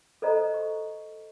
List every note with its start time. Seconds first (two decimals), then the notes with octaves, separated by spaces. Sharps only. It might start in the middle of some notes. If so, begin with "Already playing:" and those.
0.22 A4 B4 C5 D#5 A#5
0.54 C#6